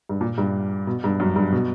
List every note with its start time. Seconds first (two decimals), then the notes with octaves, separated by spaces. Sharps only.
0.09 G2
0.21 A#2
0.38 G2
0.87 B2
1.04 G2
1.20 F#2
1.36 G2
1.52 B2